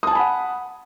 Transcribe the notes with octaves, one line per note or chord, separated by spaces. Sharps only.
F#5 G#5 A5 B5 D#6